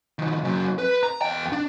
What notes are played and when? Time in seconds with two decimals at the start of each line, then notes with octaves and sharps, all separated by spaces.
0.19 D#3 F3
0.43 C#3 F#3
0.78 B4
1.03 A#5
1.22 E2 G5
1.52 D4